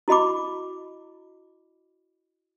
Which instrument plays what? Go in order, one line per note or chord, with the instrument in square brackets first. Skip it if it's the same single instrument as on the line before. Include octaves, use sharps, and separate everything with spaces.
[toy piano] E4 F#4 D#5 B5 D6